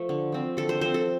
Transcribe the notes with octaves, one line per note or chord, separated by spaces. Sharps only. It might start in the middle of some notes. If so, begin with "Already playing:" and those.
Already playing: F3 A3
D3
F3 C4
D3 A4
C5
F3 C4 C5
A4